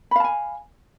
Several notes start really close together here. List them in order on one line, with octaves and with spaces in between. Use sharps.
B5 F5 A5 G#5